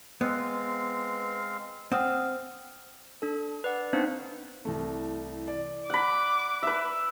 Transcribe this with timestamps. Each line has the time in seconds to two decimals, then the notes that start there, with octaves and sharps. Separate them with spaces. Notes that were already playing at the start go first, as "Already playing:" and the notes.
0.21 G#3 B3 C4 F5
1.92 C4 F#5 D#6 F6
3.22 D4 A4
3.64 B4 D5 F#5
3.93 B3 C4 D4 D#4 C5 F5
4.65 C2 E3 A3
5.48 D5
5.90 F#5 B5 D6
6.63 B4 E5